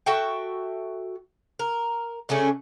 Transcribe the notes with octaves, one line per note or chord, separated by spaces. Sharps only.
F#4 A4 E5 G5
A#4
C#3 A3 C#4 D4